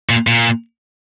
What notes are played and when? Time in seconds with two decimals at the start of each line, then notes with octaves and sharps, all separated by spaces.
0.09 A#2
0.27 A#2